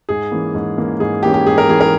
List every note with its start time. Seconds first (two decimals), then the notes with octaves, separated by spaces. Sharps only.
0.09 G#2 G#4
0.32 E3 A#3 C#4
0.55 G#2
0.78 E3 A#3 C#4
1.00 G#2 G#4
1.23 E3 A#3 C#4 G4
1.34 G4
1.46 G#2 G#4
1.58 A#4
1.68 E3 A#3 C#4 G#4
1.81 A#4